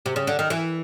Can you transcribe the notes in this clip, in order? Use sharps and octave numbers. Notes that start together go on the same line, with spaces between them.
C3
C#3
D3
D#3
E3